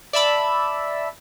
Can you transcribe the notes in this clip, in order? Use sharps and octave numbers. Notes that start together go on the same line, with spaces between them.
D5 E5 A5 B5 E6